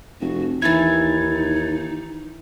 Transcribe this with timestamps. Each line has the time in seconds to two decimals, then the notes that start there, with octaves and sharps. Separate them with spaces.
0.21 F1 F#4
0.62 D#2 E3 D#4 E4 G#6 A6